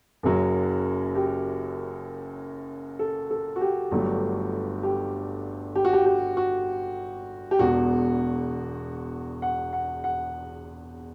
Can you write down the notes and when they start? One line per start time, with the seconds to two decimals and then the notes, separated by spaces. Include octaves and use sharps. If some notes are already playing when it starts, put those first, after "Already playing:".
0.23 F#1 F#2 F#3
1.15 G4
2.99 A4
3.31 A4
3.56 F#4
3.61 G4
3.91 G1 G2 F#3 A3
4.83 G4
5.76 G4
5.85 F#4
5.93 G4
6.06 G4
6.37 F#4
7.51 G4
7.59 E1 E2 B2 F#4
9.42 F#5
9.73 F#5
10.04 F#5